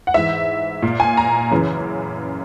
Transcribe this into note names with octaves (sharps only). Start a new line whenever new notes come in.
F#5
G#2 E3 E5
A#2
G#5
A#5
F#2 C#3 E3